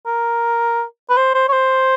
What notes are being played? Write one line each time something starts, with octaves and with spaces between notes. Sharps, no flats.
A#4
B4
C5
C5
C#5
C5